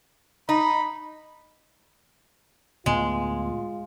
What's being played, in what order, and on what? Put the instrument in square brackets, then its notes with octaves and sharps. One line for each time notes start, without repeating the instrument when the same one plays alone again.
[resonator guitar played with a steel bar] D#4 [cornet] B5
[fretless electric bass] D2 A2 B3 [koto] G#3 [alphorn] F4